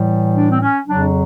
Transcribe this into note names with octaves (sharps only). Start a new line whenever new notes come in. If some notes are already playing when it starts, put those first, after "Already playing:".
Already playing: A2 E3 G3
D4
C4
C#4
F2 C#3 F#3 D4